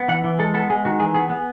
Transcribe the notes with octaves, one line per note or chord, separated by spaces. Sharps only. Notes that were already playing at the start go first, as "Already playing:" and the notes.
Already playing: B3
E3 F#5
E3
G#3 A4
B3 A4
G#3 G#4
D#3 F#4
E3 G#4
B3 G#4
B3